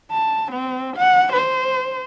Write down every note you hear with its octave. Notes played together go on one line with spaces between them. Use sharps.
A5
C4
F#5
C5